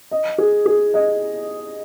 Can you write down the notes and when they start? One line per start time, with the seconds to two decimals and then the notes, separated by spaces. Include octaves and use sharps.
0.11 D#5
0.38 G#4
0.66 G#4
0.94 D#5